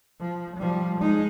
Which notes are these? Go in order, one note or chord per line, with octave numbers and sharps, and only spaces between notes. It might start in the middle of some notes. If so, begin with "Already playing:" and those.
F3
F3 G3
G#3 D#4